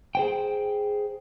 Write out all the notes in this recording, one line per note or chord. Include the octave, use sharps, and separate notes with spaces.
G#4 C5 G5